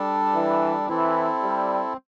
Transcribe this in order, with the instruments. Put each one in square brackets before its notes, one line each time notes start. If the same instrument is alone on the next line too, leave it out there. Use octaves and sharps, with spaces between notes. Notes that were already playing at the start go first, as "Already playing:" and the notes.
Already playing: [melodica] G3 D4 A4
[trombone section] E3
[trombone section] E3 [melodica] C4 E4 A4
[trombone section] G3